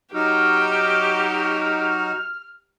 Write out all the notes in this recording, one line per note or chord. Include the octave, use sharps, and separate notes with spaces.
F#3 D#4 F#4 G4 F6